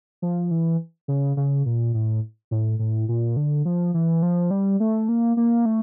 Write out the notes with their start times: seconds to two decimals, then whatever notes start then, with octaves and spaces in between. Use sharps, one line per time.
0.22 F3
0.51 E3
1.08 C#3
1.37 C#3
1.66 A#2
1.94 A2
2.51 A2
2.79 A2
3.09 A#2
3.36 D3
3.65 F3
3.94 E3
4.23 F3
4.51 G3
4.80 A3
5.09 A#3
5.37 A#3
5.65 A3